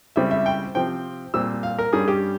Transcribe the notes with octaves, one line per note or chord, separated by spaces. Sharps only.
C#2 C#3 G3 C4 E4 E5
E5
G5
C3 F3 C4 G5
A#2 G3 C4 E6
F5
A#4
G2 G3 C#4 G#4
G4